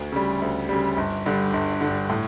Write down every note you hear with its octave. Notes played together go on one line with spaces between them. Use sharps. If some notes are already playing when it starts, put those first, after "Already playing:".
Already playing: D2
C#3 G3
D2
C#3 G3
G1
G2 D3
G1
G2 D3
A2